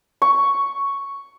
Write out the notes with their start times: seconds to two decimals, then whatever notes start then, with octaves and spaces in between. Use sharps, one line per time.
0.22 C#6